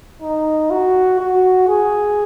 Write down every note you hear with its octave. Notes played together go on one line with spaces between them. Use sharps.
D#4
F#4
F#4
G#4